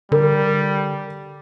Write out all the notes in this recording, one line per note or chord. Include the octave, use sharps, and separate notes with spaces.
D3 G3 A#4